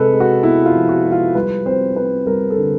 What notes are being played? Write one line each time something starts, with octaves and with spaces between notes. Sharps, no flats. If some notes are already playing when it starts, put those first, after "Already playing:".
Already playing: C3 G#3 A4 B4
G#3
F#4
B3 E4
F4
F3
F#4
G#3
F4
G3 B4
C4 C5
C4 B4
G3 A#4
A4
D3